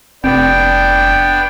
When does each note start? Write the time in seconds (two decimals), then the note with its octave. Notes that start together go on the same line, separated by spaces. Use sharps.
0.24 F1 B3 C4 D4 G5